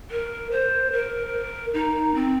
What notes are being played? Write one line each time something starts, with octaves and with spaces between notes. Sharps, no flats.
A#4
C5
A#4
D#4
C4